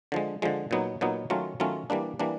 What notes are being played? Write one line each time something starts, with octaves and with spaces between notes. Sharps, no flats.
D3 F3 G#3
D3 F3 G#3
A#2 F#3 B3 D#4
A#2 F#3 B3 D#4
D#3 F#3 A3 C#4 F4
D#3 F#3 A3 C#4 F4
E3 G3 A#3 D4
E3 G3 A#3 D4